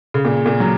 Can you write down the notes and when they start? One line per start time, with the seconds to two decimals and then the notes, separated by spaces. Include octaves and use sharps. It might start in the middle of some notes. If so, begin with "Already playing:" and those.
0.14 C#3
0.25 A#2
0.46 A#2
0.60 F#3